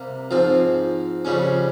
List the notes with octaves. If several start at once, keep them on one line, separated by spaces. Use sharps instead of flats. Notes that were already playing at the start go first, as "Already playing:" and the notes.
Already playing: C3 G3 A#3
G#2 F3 C4
F2 C#3 G3 C#4